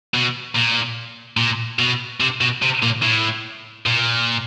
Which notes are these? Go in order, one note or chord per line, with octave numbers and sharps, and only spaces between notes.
B2
A#2
A#2
B2
C3
B2
C3
A#2
A2
A#2